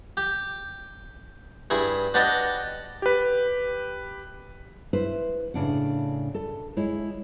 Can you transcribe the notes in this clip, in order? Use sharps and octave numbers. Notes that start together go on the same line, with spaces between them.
G4
G2 E4 G#4
D4 F#4 G4 B4 D5 D#5
G4 B4
E4 B4 C5
A2 C#3 D4 F#5
A4
G#3 E4 C#5